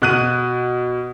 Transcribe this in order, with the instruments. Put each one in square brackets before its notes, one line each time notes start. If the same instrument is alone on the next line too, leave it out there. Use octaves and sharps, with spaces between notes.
[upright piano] B2 F#6 D#7